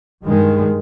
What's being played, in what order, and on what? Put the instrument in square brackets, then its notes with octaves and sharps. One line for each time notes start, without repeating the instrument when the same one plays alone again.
[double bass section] G2 D#3 G#3